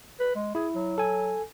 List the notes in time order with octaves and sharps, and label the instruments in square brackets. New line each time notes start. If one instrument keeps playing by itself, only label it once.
[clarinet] B4
G#3
[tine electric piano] E4 [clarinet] G#4
[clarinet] F#3
[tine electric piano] A4 G#5